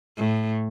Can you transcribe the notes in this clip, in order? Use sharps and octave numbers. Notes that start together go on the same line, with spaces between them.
A2